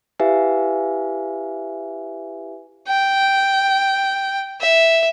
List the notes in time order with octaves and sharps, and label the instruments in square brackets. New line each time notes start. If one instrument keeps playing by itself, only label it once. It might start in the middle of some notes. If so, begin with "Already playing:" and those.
[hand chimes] E4 G4 B4 E5 F5 G#5
[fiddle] G5
E5